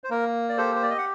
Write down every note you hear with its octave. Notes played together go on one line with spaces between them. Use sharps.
C5
A#3 A#4
D5
G4 A4 C5
C5
D5
D#5
F#5